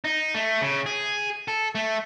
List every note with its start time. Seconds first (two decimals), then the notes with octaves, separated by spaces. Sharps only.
0.04 D#4
0.35 A3
0.61 C#3
0.86 G#4
1.48 A4
1.75 A3